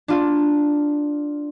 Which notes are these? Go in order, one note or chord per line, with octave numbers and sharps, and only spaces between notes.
D4 F4